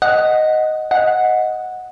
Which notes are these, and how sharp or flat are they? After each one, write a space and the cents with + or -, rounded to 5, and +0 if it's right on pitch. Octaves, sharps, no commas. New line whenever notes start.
D#5 +0 F#5 +0
D#5 +10 F#5 -10